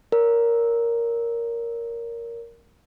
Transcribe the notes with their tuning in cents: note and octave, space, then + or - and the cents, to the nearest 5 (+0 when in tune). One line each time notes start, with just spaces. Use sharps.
A#4 +0 C#5 +45